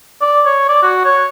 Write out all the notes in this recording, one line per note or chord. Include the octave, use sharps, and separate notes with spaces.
D5
C#5
D5
F#4
C#5